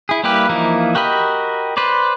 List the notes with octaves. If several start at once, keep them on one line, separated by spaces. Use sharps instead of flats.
E4 G#4
G3 A#3 E4 G4 B4
E3 F3 A#3 D#4 E4
F#4 G4 A#4 D#5 B5
B4 C5 D5